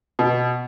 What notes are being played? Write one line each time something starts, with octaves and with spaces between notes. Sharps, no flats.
B2